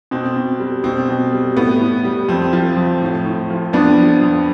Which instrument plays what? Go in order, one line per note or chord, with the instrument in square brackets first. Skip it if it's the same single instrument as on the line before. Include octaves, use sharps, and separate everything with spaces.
[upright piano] B2 C4
B2
G3
B2 C4
B2
G3
A2 B3
A2
G3
F2 C4
F3
F2
A2
A2
F3
F2 B3 D4
F3
F2